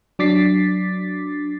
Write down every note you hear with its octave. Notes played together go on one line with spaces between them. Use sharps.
F#3 D4 D6 A6 B6 C7